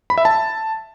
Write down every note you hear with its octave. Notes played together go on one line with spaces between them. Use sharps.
B5
E5
A5